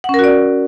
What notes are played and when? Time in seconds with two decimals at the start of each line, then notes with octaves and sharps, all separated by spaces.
0.04 F#5
0.09 C#4
0.14 A#4
0.19 F#4
0.24 D5